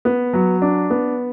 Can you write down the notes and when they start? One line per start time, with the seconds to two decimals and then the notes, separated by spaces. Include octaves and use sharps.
0.05 B3
0.33 F#3
0.62 D4
0.90 B3